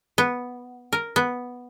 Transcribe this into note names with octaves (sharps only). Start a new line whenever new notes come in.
B3
A#4
B3